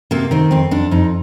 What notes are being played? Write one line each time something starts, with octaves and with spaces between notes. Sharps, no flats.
C3 A#3
D#3 C4
F2 C4
F2 D4
F2 D#4